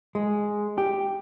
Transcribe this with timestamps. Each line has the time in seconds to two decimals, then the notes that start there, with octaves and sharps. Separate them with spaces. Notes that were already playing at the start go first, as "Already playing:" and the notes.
0.15 G#3
0.78 G4